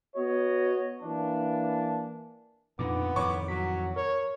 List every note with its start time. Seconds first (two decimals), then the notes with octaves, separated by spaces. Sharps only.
0.16 B3 F#4 C#5 D#5
1.03 E3 A#3 D4
2.79 F2 A#2 D3 B3 D#4 D6
3.16 F2 A2 D#3 C#5 C#6 D6
3.48 F#3 B6
3.96 A#4 C#5